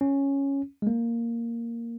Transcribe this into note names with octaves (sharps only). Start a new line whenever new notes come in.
C#4
G#3
A#3